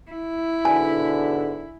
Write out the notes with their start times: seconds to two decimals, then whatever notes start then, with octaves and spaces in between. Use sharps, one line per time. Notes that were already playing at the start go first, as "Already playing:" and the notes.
0.11 E4
0.65 G#2 B2 D3 G#5